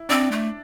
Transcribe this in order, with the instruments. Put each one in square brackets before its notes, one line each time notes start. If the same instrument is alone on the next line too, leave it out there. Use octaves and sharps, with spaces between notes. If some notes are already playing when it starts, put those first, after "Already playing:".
Already playing: [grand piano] E4
[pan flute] C4 [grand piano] D4 D5
[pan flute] A3